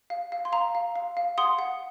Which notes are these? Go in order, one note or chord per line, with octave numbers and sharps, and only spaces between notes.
F5
F5
C6
F5 A#5
F5
F5
F5
F#5 C6 D#6
F#5